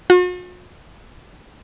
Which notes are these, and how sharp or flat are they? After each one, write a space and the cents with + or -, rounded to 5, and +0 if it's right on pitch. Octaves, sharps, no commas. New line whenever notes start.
F#4 -45